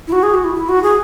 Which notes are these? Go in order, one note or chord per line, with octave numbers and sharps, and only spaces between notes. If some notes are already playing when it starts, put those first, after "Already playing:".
E4
F#4
G#4
F#4
E4
E4
F#4
G#4